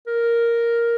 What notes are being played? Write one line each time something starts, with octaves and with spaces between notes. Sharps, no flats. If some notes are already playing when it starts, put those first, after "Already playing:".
A#4